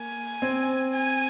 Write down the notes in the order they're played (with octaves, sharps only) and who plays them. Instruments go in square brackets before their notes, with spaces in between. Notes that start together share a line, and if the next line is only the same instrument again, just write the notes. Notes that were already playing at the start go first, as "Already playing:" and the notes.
Already playing: [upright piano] A#3 [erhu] G#5
[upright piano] C4
[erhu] G#5